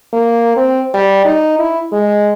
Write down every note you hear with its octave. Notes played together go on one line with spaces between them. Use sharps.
A#3
C4
G3
D#4
E4
G#3